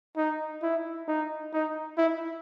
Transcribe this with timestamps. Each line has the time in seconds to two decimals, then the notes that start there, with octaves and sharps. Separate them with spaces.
0.17 D#4
0.63 E4
1.08 D#4
1.53 D#4
1.97 E4